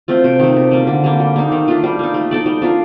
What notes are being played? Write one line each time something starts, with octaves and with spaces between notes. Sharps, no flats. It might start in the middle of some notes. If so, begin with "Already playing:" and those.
A3 C4 F4
C3
D#3 A3
C3
G3 A#3
D3
G3 A#3
G3
A#3 D#4
D#3
A3 D4 F4
G3
A#3 D#4
A3
D#4 A4 D5
G3
D4 F4 A#4